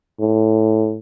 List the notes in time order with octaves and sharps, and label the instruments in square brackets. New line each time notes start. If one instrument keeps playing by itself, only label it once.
[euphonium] A2